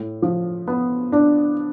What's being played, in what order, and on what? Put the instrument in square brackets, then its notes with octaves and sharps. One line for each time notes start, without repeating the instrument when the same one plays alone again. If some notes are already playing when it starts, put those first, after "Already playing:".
Already playing: [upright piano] A2
F3
B3
D4